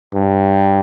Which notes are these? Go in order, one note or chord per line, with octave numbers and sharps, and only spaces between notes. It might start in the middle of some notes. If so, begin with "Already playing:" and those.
G2